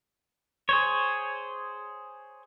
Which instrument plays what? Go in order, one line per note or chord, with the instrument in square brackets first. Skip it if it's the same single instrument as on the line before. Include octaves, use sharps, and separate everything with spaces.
[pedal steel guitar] G#4 C5 C#5